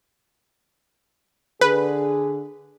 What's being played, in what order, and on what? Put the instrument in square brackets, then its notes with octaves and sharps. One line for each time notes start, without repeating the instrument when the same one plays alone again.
[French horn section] D3 G#4 [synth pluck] B4